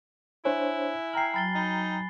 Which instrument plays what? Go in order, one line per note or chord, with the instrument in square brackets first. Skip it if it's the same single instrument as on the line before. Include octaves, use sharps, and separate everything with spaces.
[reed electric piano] D4 C5 C#5 [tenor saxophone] E4 [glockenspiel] G#5 F#6
[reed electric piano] G5 A#5 F6 [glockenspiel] C7 F#7
[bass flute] F#3 [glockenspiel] B5 A6 G7
[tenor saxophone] D#4 [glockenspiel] B5 A6